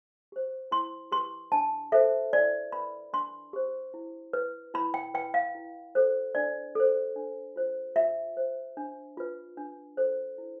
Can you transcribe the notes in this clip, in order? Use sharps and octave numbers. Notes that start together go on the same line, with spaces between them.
G4 C5
E4 C6
G4 B4 C6
D4 A5
A4 C5 E5
E4 D5
B4 B5
D4 C6
G4 C5
E4
B4
E4 B5
G5
B4 G5
F5
E4
A4 C5
D4 D5
A4 C5
D4
F4 C5
F4 E5
C5
D4
F4 B4
D4
A4 C5
E4